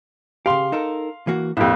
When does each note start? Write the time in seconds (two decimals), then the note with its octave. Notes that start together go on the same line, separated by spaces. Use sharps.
0.46 C#3 G4 F5 C6
0.72 D#4 A4 A#4
1.27 E3 A#3 F#4
1.57 A#1 F2 E4 G4